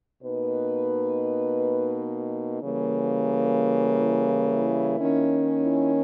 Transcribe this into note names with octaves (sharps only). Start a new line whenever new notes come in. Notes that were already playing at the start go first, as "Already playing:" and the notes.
B2 A#3 D#4 B4
C#3 E3 G3 A#3
E4
E4
D#3 A#3 C#4
E4